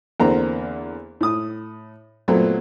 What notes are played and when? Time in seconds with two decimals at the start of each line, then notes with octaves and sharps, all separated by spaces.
0.20 E2 D3 A#3 C4 D4 A#5
1.21 A2 D#6
2.28 A#2 F#3 A3 B3 C4